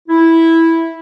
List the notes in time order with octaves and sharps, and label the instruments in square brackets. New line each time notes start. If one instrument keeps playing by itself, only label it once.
[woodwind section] E4